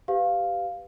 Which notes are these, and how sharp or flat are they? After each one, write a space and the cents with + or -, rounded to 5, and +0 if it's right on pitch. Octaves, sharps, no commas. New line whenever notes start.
G4 +0 B4 +20 F5 +0